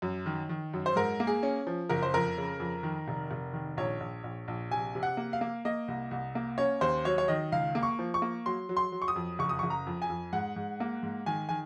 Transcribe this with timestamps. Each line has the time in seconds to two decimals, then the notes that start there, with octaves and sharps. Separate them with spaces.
0.02 F#2
0.26 D#3
0.49 D#3
0.74 F#2
0.86 C5
0.96 G#2 A#4
1.20 A#3
1.27 G#4
1.43 C#4
1.67 F3
1.89 F#1 A#4
2.03 C5
2.14 F2 A#4
2.37 C#3
2.60 F2
2.83 D#3
3.08 F1
3.31 F1
3.53 D#3
3.77 A#1 C#5
4.00 A#1
4.24 A#1
4.48 A#1
4.71 C3 G#5
4.95 C3
5.03 F#5
5.17 A#3
5.33 F5
5.41 A#3
5.65 A#3 D#5
5.88 C2
6.11 C2
6.35 A#3
6.58 C#4 C#5
6.81 D#2 C5
7.05 F#3 C#5
7.18 C#5
7.28 D#3 D#5
7.52 C#2 F5
7.75 A#3
7.83 C#6
7.99 F3
8.14 C#6
8.22 A#3
8.46 F#3 C6
8.69 F#3
8.77 C6
8.92 F#3
9.02 C#6
9.08 D#6
9.16 F2
9.39 F#1 C#6
9.49 D#6
9.59 F#1 C#6
9.70 A#5
9.86 F2
10.02 G#5
10.09 F2
10.33 G#2 F#5
10.56 G#2
10.80 A#3
11.03 G#2
11.26 D#3 G#5
11.49 D#3 G#5